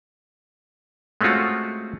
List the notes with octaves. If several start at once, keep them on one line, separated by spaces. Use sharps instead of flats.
G#3 A3 C4 C#4 F4 F#4